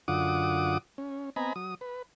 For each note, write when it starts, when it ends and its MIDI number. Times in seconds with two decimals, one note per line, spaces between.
0.08 0.78 42
0.08 0.78 50
0.08 0.78 65
0.08 0.78 78
0.08 0.78 86
0.08 0.78 87
0.98 1.30 61
1.36 1.53 59
1.36 1.53 60
1.36 1.53 75
1.36 1.53 80
1.36 1.53 82
1.36 1.53 83
1.56 1.75 54
1.56 1.75 87
1.81 2.02 71